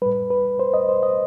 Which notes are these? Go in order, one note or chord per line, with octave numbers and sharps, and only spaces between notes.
A2 G3 B4
B4
C5
D#5
C5
D#5